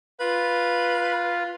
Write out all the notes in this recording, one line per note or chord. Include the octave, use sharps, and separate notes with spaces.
F4 B4